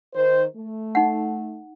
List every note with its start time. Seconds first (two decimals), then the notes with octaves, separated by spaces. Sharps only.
0.14 D#3 C5
0.56 A3
0.95 D#4 F#5